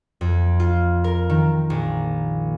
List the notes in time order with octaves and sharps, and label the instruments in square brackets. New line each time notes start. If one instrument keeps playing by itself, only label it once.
[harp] F2
F4
A#4
D#3
A#1